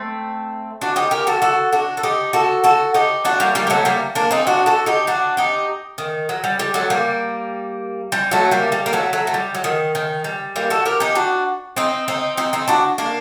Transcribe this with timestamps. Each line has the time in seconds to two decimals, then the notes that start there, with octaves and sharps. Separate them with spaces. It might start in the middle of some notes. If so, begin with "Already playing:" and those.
Already playing: A3 C4
0.81 D4 F#4
0.96 D#4 G4
1.11 G4 A#4
1.27 F#4 A4
1.42 F#4 A4
1.72 D4 F#4
1.97 A4
2.03 D#4 G4
2.33 F#4 A4
2.64 F#4 A4
2.94 D#4 G4
3.25 D4 F#4
3.40 G3 A#3
3.55 G3 A#3
3.67 A#3
3.70 F#3 A3
3.85 G3 A#3
4.15 A#3 D4
4.31 C4 D#4
4.47 D4 F#4
4.66 F#4 A4
4.86 D#4 G4
5.07 D4 F#4
5.37 D#4 G4
5.98 D#3
6.29 F#3
6.44 G3
6.59 G3
6.74 F#3 A3
6.90 G3 A#3
8.12 G3
8.31 F#3 A3
8.51 G3 A#3
8.72 G3
8.86 A#3
8.93 F#3 A3
9.13 F#3 A3
9.27 A3
9.34 G3
9.54 F#3
9.64 D#3
9.95 D#3
10.24 G3
10.56 G3 A#3
10.70 F#4 A4
10.86 G4 A#4
11.00 D#4 G4
11.15 D4 F#4
11.76 C4 D#4
12.08 C4 D#4
12.37 C4 D#4
12.53 C4 D#4
12.68 D4 F#4
12.98 A#3 D4